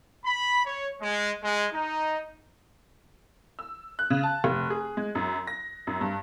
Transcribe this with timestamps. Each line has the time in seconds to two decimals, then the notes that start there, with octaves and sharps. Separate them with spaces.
0.25 B5
0.66 C#5
1.02 G#3
1.43 G#3
1.73 D#4
3.59 E6
3.99 F#6
4.10 C#3
4.23 A5
4.44 F1
4.70 G#4
4.97 G#3
5.15 F#2
5.47 A#6
5.87 F#2
6.01 G2